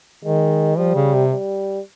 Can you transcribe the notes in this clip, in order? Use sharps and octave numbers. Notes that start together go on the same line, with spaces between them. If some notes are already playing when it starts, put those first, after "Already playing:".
D#3 G#3
F3 G3
C#3
C3
G3